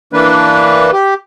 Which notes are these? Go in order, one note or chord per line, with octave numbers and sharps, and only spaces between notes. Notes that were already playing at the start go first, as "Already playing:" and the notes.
E3 A#3 D4 B4
G4